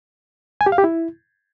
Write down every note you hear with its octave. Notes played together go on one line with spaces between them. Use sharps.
G#5
G4
F5
G4
E4